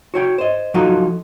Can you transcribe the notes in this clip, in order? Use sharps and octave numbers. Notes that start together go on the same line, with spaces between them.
F#4 C#5 G5
C5 D#5
F3 F#3 A3 D#4 F4 F#4